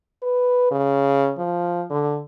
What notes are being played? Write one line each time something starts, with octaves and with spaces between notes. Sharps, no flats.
B4
C#3
F3
D3